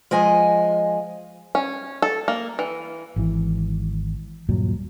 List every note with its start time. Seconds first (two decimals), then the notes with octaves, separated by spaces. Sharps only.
0.11 F3 G#3 D#5 G#5
1.55 C#4
2.02 A4
2.28 A#3
2.59 E3
3.16 G#1 E3
4.49 D#1 G2 A#2 F#3